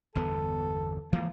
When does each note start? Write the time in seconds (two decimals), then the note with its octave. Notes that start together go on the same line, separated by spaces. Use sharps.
0.15 G1 E2 B3 A4
1.13 E3 F3 G#3 A#3